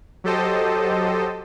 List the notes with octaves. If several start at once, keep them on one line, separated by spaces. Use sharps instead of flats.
F#3 G4 A4 C5 D#5